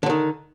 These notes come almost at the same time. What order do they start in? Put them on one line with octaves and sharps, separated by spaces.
D3 F#3 D#3